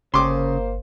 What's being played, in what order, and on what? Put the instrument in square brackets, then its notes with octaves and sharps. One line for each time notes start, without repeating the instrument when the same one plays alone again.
[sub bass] G1 [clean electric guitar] C#3 [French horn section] A#3 C5 [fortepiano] C6 D6